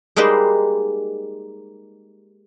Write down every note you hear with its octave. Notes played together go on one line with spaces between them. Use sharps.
G3 G#3 A#3 D#4 B4 C5